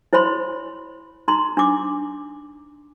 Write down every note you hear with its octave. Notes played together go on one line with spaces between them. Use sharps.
E4 C5 C#5 B5 C6
D#4 A#5 C6
D4 D6